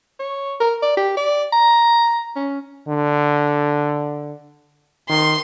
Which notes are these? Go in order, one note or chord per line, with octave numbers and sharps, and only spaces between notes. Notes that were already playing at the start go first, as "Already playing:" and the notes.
C#5
A#4
D5
G4
D5
A#5
C#4
D3
D#3 C6